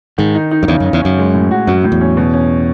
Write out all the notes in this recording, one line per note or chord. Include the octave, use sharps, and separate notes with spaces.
G#2 D#3
D#4
D#4
F#2
E2 C#3
F#2
C#3
E2
F#2 C#4
G#3
A2
F#4
F#2 F#3
A2
E2
C#4
B2
C#4